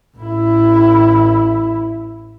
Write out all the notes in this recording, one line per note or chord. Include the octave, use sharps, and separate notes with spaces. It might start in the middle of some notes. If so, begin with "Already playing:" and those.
A1 E4